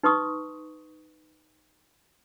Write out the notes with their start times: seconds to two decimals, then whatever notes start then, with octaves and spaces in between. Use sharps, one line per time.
0.03 D#4 B4 C6 C#6 D#6